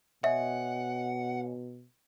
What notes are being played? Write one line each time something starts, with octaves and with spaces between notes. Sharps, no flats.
B2 C#5 D#5 E5 F#5 G#5